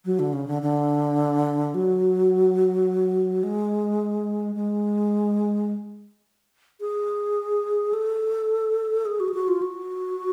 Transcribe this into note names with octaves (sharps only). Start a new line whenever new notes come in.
F#3
D3
C#3
D3
D3
F#3
G#3
G#3
G#4
A4
G#4
F#4
G#4
F#4
F4
F#4